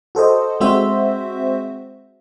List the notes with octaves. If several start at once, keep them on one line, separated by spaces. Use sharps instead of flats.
F#4 A4 C5 D#5
G#3 C4 F#4 C5 E5